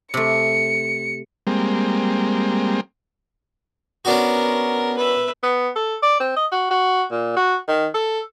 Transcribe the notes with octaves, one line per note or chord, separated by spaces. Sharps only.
C3 A3 C#7
G3 G#3 A#3 C4
B3 C#4 D4 F#4 A#4
B4 E5
B3
A4
D5
C4
D#5
F#4
F#4
A#2
F#4
D#3
A4